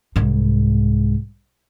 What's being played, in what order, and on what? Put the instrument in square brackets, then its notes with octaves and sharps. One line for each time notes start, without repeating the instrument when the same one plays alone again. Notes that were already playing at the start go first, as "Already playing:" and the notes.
[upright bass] C2 G#2